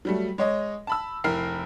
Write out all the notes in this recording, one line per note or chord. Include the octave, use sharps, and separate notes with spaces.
F#3 G3 A3
G#3 C#5 D#5
A5 B5 E6
F1 E4 A#4 F6 C7